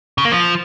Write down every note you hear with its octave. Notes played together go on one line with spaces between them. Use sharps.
C#3
A#3
F3